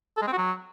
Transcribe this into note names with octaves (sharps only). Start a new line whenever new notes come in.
A4
G#3
C4
F#4
F#3